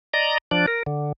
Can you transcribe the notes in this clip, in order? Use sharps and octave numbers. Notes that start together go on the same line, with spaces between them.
D5 D#5 A#5
F3 D4 D5
A#4
D3